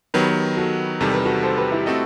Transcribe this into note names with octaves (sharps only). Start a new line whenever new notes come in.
D#3 F#3 B3 G4 B4
F#4 A4
E2 C3 D#3 G3 A4
B4
F#4 A4
A4 C5
G4 B4
E4 G4
A3 C4 F#4 A4 D#5